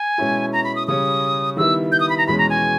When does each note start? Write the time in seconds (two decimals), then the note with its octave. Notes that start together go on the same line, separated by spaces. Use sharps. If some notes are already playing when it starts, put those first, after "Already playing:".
Already playing: G#5
0.18 B2 G#3 C#4 E4
0.53 A#5
0.64 B5
0.76 D#6
0.87 C#3 G3 C#4 D#6
1.57 D#3 G3 B3 E4 E6
1.92 G6
2.00 D#6
2.09 B5
2.18 A#5
2.27 E2 B2 G#3 C#4 B5
2.38 A#5
2.50 G#5